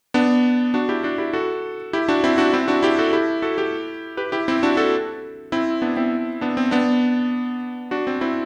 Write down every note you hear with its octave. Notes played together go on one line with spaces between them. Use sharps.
B3 D4
D4 F#4
E4 G4
D4 F#4
E4 G4
F#4 A4
E4 G4
D4 F#4
C4 E4
D4 F#4
C4 E4
D4 F#4
E4 G4
F#4 A4
E4 G4
F#4 A4
E4 G4
G4 B4
E4 G4
C4 E4
D4 F#4
F#4 A4
C4 E4
B3 D4
C4 E4
B3 D4
C4
B3 D4
D4 F#4
C4
C4 E4